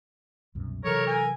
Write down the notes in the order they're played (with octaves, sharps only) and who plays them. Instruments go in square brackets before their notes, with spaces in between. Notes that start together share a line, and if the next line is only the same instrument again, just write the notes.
[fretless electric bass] C2 F#2 B2
[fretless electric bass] C3 E3 F#3 [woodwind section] A4 A#4 [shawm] C#5
[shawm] G#5